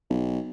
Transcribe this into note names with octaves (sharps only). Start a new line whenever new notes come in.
B1